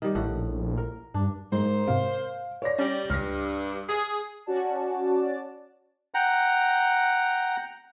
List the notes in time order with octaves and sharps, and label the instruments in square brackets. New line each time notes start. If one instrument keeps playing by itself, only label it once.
[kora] D#3 G3
[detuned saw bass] A#1 [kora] A2 F#5
[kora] A#4
[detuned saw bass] G2 [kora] D4
[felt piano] G#2 [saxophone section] A#3 C5
[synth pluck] G#2 C3 [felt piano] F5
[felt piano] C#5 D5 A#6
[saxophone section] G3 [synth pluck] C#4
[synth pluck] C#2 A#6 [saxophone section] G2 [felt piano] F6
[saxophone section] G#4
[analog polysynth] C#4 F#4 D5 A5
[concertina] F#5 G5 A#5